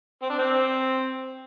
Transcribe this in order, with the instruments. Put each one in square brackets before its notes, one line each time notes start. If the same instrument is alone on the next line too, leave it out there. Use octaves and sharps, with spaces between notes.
[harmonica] C4
D4
C4